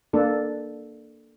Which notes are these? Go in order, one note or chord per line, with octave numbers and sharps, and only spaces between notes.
A#3 D4 A4